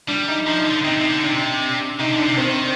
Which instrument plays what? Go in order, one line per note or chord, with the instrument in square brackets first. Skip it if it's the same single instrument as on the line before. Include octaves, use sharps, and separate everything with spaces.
[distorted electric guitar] G3 [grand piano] D4
[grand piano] D#4
[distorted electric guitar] F3 [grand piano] D#4
[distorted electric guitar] D3
[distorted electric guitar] C3 [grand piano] D#4
[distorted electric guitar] C3
D3
[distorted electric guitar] C3 [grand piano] D4
[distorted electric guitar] C3 [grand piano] D#4
[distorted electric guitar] D3
[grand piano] D4
[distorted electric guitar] C3
[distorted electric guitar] D#3 [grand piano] C4